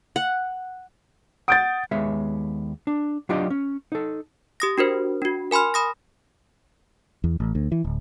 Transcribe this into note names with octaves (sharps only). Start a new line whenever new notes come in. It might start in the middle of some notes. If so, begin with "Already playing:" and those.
F#5
F#5 D#6 G6 A6 D7
D#2 G#3 B3 C#5 E5
D4
F#3 D4 F4 G4 D5 D#5
C#4
D#4 A4
G4 D#6 A#6
D4 F#4 A#4 C5
D4 F#4
A#4 G#5 B5 C6 F6
B5 D#6 A#6
E2
A1
D2
E3
D1